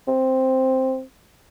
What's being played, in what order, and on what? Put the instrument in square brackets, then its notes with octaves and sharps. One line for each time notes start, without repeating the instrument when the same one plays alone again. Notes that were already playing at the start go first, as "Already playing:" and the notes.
[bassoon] C4